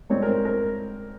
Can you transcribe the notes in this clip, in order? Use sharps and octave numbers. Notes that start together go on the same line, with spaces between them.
G#2 G3 C4 C#5
A#4
C5
A#4